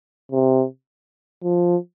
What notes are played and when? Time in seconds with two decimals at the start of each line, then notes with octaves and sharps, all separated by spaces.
0.32 C3
1.43 F3